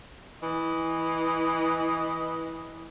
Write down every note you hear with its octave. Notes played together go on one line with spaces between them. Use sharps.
E3 D#5